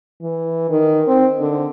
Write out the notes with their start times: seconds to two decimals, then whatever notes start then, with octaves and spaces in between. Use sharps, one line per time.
0.22 E3
0.70 D#3
1.08 C4
1.40 D3